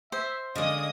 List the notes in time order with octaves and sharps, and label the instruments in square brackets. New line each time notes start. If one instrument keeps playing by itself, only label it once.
[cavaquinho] C5 [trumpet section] E5
[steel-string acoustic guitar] D3 G#3 [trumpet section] C#4 D5 F5 [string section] D#5 D#6